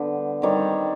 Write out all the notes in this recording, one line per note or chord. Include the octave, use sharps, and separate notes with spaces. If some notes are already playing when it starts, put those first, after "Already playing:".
Already playing: D3 G3 B3 B4
D#3 G3 C4 C#5